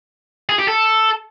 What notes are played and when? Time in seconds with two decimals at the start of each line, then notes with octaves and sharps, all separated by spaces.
0.49 G#4
0.59 G4
0.68 A4